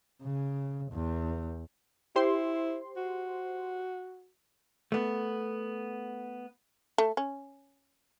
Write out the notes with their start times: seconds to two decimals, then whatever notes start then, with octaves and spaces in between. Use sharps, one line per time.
0.23 C#3
0.92 E2
2.16 E4 G4 C5 C6
2.97 F#4
4.92 A3 B3
6.98 A3
7.17 C#4